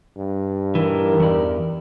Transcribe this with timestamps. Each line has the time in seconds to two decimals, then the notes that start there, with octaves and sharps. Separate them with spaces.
0.18 G2
0.75 E3 D#4 G4 A#4
1.20 E2 D5